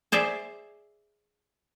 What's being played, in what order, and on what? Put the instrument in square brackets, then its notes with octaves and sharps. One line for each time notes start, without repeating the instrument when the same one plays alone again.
[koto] G#4 C5 D5 E5